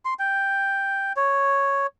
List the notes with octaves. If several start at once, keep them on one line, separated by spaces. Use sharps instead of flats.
C6
G5
C#5